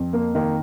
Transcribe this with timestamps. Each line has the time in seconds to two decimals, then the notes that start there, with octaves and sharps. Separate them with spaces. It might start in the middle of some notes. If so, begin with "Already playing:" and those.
Already playing: F2
0.13 A#3
0.35 D#3 A#3